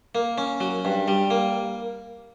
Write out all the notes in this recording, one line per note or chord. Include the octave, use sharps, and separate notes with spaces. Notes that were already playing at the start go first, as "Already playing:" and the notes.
A#3
C#4
F#3
G2
G3
A#3